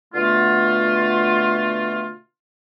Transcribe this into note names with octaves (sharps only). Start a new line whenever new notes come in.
B2 D3 A3 B3 F4